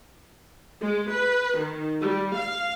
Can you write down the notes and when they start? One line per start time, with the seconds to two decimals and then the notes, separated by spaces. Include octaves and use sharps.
0.81 G#3
1.12 B4
1.58 D#3
2.00 G3
2.36 F5